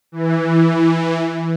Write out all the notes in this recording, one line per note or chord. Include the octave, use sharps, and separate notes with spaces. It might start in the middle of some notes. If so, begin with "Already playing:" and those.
E3